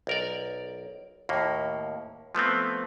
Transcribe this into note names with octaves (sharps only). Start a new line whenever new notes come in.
B1 A#4 D5
D#2 A2 A#3
F3 A3 B3 C4